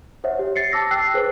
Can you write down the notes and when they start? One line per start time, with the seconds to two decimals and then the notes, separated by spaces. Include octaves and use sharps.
0.24 C5 C#5 E5 F#5
0.39 G4
0.56 A6 C7 C#7
0.72 A5 D6 E6 A#6
0.91 G5 E6 F#6 C7
1.14 G#4 B4 C5